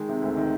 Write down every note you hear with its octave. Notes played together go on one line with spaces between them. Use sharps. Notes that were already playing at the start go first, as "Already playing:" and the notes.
Already playing: D#3 G#3
C3
D2
D#3